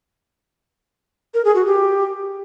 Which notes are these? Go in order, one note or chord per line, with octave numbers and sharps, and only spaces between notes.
A#4
G#4
F#4
G4